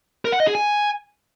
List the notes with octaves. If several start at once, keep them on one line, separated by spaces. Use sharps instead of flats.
A#4
F#5
D#5
G#4
G#5